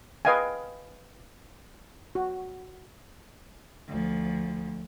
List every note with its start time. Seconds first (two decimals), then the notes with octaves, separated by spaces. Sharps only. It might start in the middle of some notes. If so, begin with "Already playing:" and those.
0.25 B4 D#5 F5 G5 G#5
2.15 F#4
3.88 D2 F3